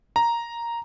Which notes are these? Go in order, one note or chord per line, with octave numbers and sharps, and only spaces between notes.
A#5